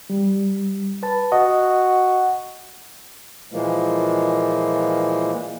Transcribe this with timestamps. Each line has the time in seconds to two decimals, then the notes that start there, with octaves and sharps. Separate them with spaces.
0.10 G3
1.03 B4 A5
1.32 F#4 D#5
3.52 A#2 E3 F3 G#3 A#3